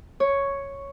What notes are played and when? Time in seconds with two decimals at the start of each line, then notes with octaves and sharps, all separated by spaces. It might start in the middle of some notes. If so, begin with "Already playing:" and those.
0.20 C#5